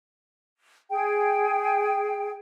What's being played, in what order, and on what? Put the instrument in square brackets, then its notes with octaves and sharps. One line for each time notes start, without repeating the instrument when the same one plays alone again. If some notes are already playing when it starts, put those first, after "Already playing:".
[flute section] G#4 G5